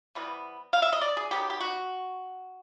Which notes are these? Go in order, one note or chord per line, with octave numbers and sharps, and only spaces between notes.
C3 E3 G3 B3
F5
E5
D#5
D5
G#4
D#3 F#3 B3 G4
G4
F#4